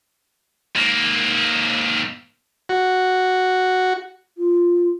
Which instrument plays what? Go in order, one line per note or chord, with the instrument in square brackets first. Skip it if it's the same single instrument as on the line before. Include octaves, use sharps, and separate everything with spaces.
[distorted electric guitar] G#2 A#3
[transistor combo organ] F#4
[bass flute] F4